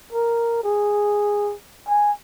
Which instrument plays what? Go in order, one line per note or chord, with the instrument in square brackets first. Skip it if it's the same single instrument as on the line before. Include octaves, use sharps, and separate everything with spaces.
[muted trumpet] A#4
G#4
G#5